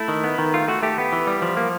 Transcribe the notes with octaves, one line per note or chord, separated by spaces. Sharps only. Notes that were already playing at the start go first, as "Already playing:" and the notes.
Already playing: A3 E4
D#3
B3
D#3
A3 F4
A3 F#4
A3 G4
B3
E3
G3
F3
A#3